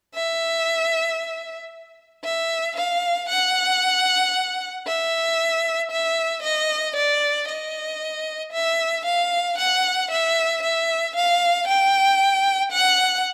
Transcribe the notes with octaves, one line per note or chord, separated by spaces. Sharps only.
E5
E5
F5
F#5
E5
E5
D#5
D5
D#5
E5
F5
F#5
E5
E5
F5
G5
F#5